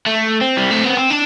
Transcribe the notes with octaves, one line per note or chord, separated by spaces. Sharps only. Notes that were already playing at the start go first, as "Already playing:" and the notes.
A3
C4
G3
A3
B3
C4
D4